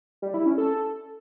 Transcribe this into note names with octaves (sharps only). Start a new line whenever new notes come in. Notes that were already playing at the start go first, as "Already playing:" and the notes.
G3
E4
C#4
A4